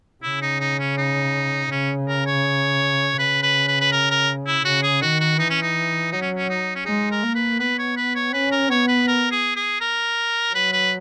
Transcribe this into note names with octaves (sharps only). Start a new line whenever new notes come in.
C#3 E4
D#4
D#4
C#4
D#4
C#3 C#4
A#4
C#5
C#3 B4
B4
B4
B4
A#4
A#4
E4
C#3 F#4
G#4
D#3 F#4
F#4
E3 D#4
C#4
D#4
F#3 D#4
C#4
C#4
D#4
C#4
G#3 D#4
A#4
A#3
B4
B3 B4
C#5
B4
C#5
C#4 B4
A#4
B3 C#5
B4
A#4
G#4
G#4
A#4
F#3 B4
B4